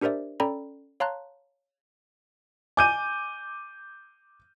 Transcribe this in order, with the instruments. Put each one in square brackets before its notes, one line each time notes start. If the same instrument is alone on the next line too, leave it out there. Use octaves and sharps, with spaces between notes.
[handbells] D4 G4 A#4 C5 D5 E5
C#4 A4 D5 G5 A#5 B5
C#5 F5 A5 A#5 C6 F#6
[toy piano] D#5 G#5 [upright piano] D6 G6 D#7